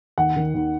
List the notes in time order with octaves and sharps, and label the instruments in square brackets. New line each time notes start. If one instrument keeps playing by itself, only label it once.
[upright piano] D#2 F#5
D#3
D#2